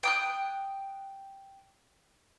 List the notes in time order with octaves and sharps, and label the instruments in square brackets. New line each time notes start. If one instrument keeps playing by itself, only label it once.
[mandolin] G5 D#6 F#6